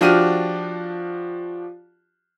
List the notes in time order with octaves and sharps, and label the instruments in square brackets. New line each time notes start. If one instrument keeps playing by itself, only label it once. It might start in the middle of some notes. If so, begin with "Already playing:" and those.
[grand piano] F3 D4 F#4 G4 F6 D#7